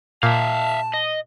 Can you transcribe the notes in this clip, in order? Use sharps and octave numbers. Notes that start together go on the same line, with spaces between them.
A#2 E5 F5 A5
D#5